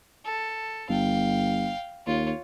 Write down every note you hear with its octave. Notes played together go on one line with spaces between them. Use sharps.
A4
G1 F5 G5
D#2 F4 C#5